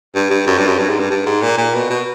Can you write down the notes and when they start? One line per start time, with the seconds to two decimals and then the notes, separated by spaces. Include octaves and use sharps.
0.15 G2
0.31 G2
0.47 F#2
0.58 G2
0.68 F#2
0.78 G2
0.89 G#2
1.00 G2
1.11 G2
1.26 G#2
1.42 A#2
1.58 A#2
1.74 B2
1.90 B2